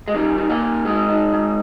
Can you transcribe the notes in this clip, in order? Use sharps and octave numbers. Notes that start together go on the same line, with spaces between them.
G#3
D#3 G3
D#3
A#2 A#3
D#3
G#2 G#3
D#3
G#2